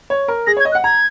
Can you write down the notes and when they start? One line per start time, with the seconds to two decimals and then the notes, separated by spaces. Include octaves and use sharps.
0.10 C#5
0.28 A#4
0.47 G#4 A#6
0.57 C#5 G#6
0.65 D#5
0.72 F#6
0.75 F#5
0.84 A#5 G#6